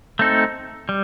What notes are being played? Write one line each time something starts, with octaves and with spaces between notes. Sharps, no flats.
A3 C4 D#4 A4
G3